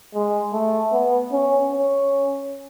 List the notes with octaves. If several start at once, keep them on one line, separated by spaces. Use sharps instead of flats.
G#3
A3
B3
C#4
C#4